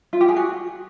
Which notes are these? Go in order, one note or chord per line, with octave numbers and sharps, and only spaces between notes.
F4
G4
G#4
F#4